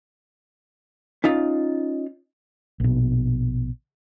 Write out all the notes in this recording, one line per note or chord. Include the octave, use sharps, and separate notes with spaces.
C#4 D#4 F4
A#1 B2